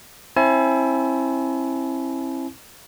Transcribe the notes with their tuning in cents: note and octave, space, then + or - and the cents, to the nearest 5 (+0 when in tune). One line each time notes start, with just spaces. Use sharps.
C4 +35 E4 +0 G#5 +45